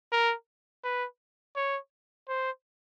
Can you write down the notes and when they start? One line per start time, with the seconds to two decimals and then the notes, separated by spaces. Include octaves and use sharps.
0.12 A#4
0.84 B4
1.56 C#5
2.29 C5